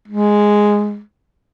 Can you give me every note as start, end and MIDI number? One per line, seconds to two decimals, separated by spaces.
0.08 1.00 56